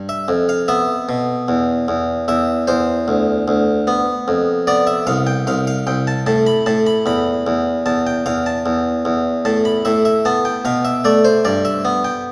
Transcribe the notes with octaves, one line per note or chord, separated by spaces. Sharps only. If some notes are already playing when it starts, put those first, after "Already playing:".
Already playing: G2
E5
F2
F5
B3 E5
B2
E2
E2
E2 E5
E2 C5
D2
D2
B3
F2
B3 D5
E5
C2 F5
G5
C2 F5
F5
C2 G5
A5
A2 A5
B5
A2 A5
B5
E2 B5
E2
E2 A5
G5
E2 F5
A5
E2
E2
A2 A5
B5
A2 E5
E5
B3 A5
G5
B2 F5
E5
A3 D5
C5
G2 D5
E5
B3
G5